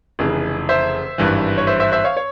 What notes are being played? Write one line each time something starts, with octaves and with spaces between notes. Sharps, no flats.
F1 F2 C#3 E3
C5 E5
G#1 G2 E3
C#5
C5 E5
C5 E5
C5 E5
C#5 F5
C#5